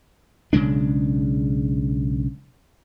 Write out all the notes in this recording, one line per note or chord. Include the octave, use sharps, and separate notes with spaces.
B1 C#3 G#3 D4